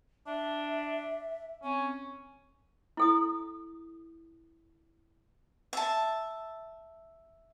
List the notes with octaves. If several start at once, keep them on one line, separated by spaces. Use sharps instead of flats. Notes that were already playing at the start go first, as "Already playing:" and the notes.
D4 E5
C4 C#4
E4 A4 D#6
E5 A5